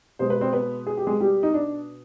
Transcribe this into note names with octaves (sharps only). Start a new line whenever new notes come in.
B2 G#3 C5
B4
C4 C5
B3 B4
G#4
G4
G#3 G#4
G3 G4
D#4
D4